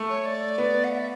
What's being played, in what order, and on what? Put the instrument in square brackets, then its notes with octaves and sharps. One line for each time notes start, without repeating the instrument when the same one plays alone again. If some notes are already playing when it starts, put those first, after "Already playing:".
Already playing: [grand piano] A3
[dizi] C#5
D5
[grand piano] B3
[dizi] F#5
E5